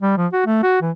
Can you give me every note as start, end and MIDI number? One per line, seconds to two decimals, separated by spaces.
0.02 0.15 55
0.17 0.27 53
0.33 0.42 66
0.46 0.63 57
0.63 0.81 66
0.81 0.91 52